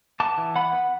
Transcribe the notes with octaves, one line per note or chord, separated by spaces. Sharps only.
B3 A5 D6
E3
B3 F#5 B5
B3